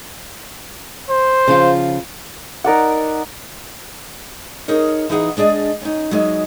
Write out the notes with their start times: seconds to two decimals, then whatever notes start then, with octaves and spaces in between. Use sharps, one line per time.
1.09 C5
1.48 C#3 F3 F4
2.64 D#4 A#4 D5 F#5
4.68 D#4 G#4 A#4 C#5
5.09 E3 D#4 G#4 F#5 A#5
5.37 G#3 D4 G#4 D5 D#5
5.81 C#4 D#4
6.11 F#3 G#3 D#4 G#4 E5